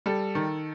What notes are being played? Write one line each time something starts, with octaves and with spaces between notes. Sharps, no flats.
G3 A4
D#3